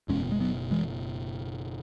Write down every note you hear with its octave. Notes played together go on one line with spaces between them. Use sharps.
F#1 E2 B2 G#3 C#4
G#3
F#3 B3
E3 G#3